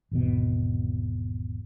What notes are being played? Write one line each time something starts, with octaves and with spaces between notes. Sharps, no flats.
G#1 E2 B2